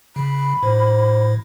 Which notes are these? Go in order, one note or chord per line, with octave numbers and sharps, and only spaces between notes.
C#3 B5
A2 C5